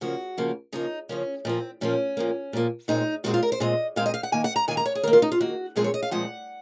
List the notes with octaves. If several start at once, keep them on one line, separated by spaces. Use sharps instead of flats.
C#3 F3 A#3 F#4
C#3 F3 A#3
C#3 F3 A#3 D#4
C#3 F3 A#3 C#4
A#2 F3 A#3 C4
A#2 F3 A#3 C#4
A#2 F3 A#3
A#2 F3 A#3
A#2 G#3 C4 D#4
A#2 G#3 C4 F#4
F4
A#4
C5
A#2 G#3 C4 D#5
A#2 G#3 C4 F5
D#5
F5
F#5
D#3 A#3 G#5
F#5
A#5
D#3 A#3 G#5
A#5
C#5
G#4
D#3 A#3 A#4
F4
D#4
F4
D#3 A#3 F#4
A#2 F3 G#3 C4 G#4
C#5
D#5
F5
A#2 F3 G#3 C4 F#5